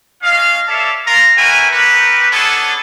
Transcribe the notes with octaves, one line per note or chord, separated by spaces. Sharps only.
C#4 F4 D#5 F5
A4 C#5 D5 E5 F5 A5
F4 A#4 F5 A#5
F#4 A#4 B4 E5 G5 G#5
C4 F#4 G4 A#4 B4
B3 C#4 D4 G#4 A4 C#5